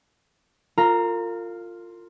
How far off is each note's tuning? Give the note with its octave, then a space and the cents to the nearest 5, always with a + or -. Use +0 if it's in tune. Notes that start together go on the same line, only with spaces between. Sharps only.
F4 +0 A#4 -40 A#5 +0